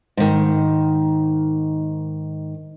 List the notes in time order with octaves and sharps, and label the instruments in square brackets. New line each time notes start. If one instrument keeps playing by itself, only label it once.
[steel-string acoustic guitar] G#2 D#3